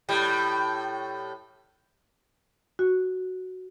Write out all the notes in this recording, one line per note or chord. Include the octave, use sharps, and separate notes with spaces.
A2 G3
F#4